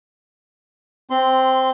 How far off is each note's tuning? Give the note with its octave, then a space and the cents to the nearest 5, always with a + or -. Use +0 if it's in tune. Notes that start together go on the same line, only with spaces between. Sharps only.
C4 +0 C6 -15